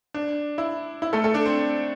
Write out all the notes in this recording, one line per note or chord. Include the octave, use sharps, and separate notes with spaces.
D4
E4
E4
A3 A4
A3 A4
D4 D5
C4 C5